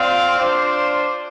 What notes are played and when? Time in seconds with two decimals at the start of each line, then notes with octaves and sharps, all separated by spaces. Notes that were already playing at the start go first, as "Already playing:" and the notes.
Already playing: C4 F4 D5 F5
0.38 D4 F4 C5